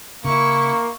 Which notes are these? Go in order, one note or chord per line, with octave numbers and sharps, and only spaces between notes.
C#3 A#3 E4 C#6